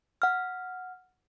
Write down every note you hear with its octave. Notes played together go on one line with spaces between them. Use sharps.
F#5 F6